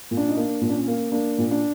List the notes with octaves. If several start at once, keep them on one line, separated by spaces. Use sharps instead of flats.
A#2
D4
D#4
A#3 D4
A#2
D4
C#4
A#3
A#3 D4
A#2
D4